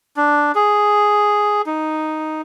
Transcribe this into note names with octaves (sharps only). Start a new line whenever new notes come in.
D4
G#4
D#4